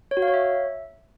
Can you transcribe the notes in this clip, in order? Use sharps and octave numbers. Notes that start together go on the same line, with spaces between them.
C#5
F#4
F5
C#5
E5